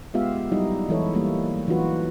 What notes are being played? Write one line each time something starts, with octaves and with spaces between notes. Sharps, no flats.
G#3 B3 F4 G4 E5 F5
F#3 G3 D#4 E4 D#5
E3 G#3 E4 A4 C#5
G3 A#3
E3 F#3 D#4 F4 F#4 B4